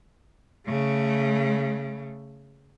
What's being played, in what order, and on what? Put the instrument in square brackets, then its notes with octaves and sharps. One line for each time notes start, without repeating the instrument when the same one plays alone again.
[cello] C#3 A3